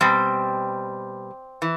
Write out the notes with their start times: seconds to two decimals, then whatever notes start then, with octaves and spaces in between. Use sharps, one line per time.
0.01 B2 G3 C4
1.62 E3